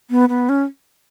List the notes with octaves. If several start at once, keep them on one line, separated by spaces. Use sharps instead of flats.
B3
B3
C#4